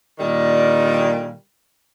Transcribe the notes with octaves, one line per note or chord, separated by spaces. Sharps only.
A#2 D3 D#3 G3